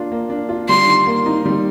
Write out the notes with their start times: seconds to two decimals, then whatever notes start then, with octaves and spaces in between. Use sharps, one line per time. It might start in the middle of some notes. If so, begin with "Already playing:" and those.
Already playing: A#3 D4 F4
0.12 A#3
0.30 D4
0.49 F4
0.69 G3 C6
0.87 D#3
1.07 A#3
1.26 D#4
1.46 G3